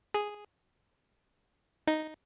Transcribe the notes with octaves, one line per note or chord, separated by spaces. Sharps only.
G#4
D#4